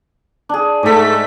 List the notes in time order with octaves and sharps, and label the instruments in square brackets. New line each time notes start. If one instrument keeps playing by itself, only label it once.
[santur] D4 G#4
[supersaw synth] G#2 A3 B6 [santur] A4 D5